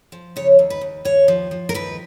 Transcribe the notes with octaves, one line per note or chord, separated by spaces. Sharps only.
F3
C#3 C#5
D#2
B4
D#2
D#2 C#5
F3
F3
A#4
D#2 B4